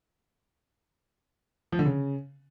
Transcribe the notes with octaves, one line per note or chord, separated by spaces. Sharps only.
F3
D3
C#3